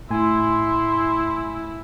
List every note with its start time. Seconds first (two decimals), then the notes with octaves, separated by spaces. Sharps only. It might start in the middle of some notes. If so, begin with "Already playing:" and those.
0.11 A2 E4 G#5 C6